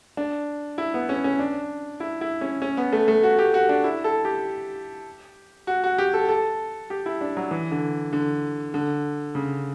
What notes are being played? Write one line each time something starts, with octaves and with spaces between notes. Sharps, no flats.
D4
E4
B3
C#4
C#4
D4
E4
E4
C#4
C#4
B3
A3
A3
F#4
G4
F#4
D4
E4
A4
G4
F#4
F#4
G4
A4
A4
G4
E4
D4
F#3
E3
D3
D3
D3
C#3